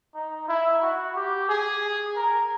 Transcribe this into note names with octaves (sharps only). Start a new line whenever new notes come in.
D#4
E4
F#4
G4
G#4
A#4